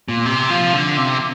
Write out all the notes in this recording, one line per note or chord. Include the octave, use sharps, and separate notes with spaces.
A#2
C3
F3
D3
C3